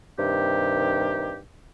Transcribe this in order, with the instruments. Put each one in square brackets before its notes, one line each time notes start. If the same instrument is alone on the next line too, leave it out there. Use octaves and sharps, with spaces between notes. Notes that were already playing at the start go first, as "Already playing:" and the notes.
[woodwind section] G2 C3 D#3 G4